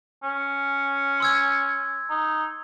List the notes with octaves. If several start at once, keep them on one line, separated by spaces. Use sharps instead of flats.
C#4
C6 E6 G#6
D#4